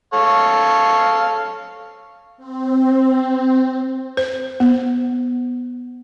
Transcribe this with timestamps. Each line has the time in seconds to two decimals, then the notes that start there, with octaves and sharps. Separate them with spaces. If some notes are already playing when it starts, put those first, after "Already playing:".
0.13 A4 C#5 F5
2.37 C4
4.17 C5
4.60 B3